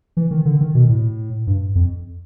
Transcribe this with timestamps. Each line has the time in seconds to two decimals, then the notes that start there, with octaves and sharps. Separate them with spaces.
0.17 E3
0.31 D#3
0.45 D3
0.61 D#3
0.75 B2
0.89 A2
1.47 G2
1.75 F2